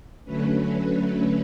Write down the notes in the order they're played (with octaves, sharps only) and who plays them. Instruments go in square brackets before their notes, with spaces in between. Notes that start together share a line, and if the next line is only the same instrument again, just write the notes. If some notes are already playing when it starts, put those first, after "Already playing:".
[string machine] D3 F#3 A3 C#4 B4